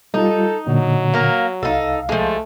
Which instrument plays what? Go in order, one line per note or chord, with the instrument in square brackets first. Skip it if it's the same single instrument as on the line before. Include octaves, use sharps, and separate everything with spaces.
[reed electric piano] G3 F4 [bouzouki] D#4 [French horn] A4
[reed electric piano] A#2 D3 [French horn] F#3
[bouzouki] A#3 A#4
[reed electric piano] C2 F5 [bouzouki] D#4 A4
[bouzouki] F3 G#3 [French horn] A3